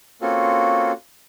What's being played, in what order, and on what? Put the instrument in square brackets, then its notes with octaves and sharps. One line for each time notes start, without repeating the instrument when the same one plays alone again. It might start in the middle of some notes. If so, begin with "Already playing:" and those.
[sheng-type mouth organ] A#3 C4 C#4 F4 F#4 A4